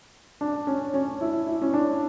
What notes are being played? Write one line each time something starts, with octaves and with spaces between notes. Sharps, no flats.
D4
C#4
C#4
E4
E4
C#4
D4